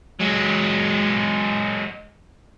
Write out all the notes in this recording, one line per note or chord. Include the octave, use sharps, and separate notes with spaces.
F#3 G#3